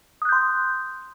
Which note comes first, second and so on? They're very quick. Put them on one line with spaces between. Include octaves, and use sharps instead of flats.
D#6 F#6 G6 C6